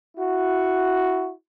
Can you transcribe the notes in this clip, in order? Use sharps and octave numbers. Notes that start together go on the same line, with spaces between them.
E4 F#4